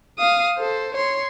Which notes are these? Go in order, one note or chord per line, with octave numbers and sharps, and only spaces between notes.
F5 D#6
A4 C5
C#5 C6